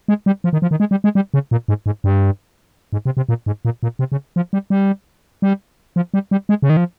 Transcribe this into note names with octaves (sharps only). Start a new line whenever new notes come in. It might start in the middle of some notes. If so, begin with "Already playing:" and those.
G#3
G3
F3
D#3
F3
D#3
G#3
G3
G#3
G3
C#3
A#2
G#2
G#2
G2
G#2
C3
C3
A#2
G#2
A#2
A#2
C3
C#3
F3
G3
G3
G3
F3
G3
G3
G#3
C#3
D#3
F3